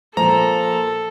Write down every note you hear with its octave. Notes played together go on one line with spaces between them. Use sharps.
A#2 F3 A4 A#5